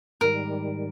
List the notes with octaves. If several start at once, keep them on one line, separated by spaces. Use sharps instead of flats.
G#2 D#3 G3 A#4